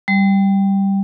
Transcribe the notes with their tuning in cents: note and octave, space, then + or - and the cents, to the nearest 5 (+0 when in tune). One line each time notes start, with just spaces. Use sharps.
G3 +0